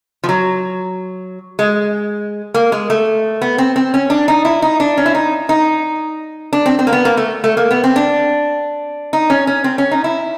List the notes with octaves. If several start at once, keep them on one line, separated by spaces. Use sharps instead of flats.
F3
F#3
G#3
A#3
G#3
A3
B3
C4
C4
C#4
D4
D#4
E4
D#4
D4
C#4
E4
D#4
D#4
D4
C4
C4
A#3
B3
A#3
A3
A3
A#3
B3
C4
D4
D#4
C#4
C#4
C4
C#4
D#4
E4